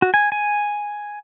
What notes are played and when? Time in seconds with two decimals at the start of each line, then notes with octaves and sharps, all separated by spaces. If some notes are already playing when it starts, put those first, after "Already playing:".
0.02 F#4
0.14 G#5
0.32 G#5